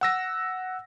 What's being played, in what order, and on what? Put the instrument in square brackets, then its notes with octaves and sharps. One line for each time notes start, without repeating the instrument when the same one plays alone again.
[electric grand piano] F#5 E6 A#6